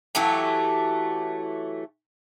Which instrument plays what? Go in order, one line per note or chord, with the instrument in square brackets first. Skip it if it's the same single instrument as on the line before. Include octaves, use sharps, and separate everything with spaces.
[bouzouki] E3 F#3 A3 G4